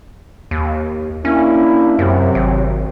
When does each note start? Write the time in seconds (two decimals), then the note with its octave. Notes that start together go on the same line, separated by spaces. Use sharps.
0.51 D#2
1.25 A#3 C#4 D4 E4
1.99 F#2 C3 F#3
2.35 G#1